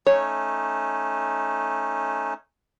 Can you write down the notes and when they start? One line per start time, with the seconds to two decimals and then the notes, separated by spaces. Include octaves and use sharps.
0.07 A3 C#4 D#4 C#5